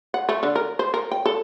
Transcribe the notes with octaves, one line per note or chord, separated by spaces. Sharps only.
F#5
A3
D3
A#4
C5
A#4
G5
A4